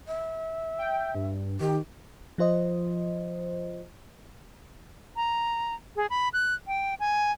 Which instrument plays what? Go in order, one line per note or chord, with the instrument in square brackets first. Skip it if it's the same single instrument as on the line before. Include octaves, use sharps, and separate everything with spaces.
[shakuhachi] E5
[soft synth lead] G5
G2
[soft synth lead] D#3 [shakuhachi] G4
[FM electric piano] F3 F4 C5 D#5
[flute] A#5
G#4
B5
F#6
G5
G#5